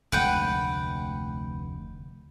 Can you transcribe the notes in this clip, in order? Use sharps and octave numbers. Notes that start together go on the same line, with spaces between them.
F1 D2 G#3 B4 F#5 G5